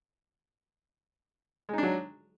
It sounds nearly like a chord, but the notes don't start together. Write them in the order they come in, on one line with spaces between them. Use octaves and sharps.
G#3 D#4 D4 F#3